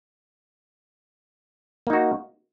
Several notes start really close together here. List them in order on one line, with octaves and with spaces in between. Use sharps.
A#3 D#4 F#4